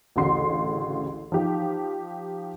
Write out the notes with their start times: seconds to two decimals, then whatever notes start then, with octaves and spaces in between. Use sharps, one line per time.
0.16 A1 D2 C#3 F#4 C6 C7
1.32 F3 D#4 G4